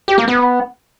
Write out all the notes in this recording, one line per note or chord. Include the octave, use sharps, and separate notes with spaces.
G4
A#3
B3